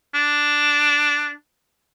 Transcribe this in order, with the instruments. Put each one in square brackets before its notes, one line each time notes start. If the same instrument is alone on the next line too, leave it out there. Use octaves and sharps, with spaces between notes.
[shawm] D4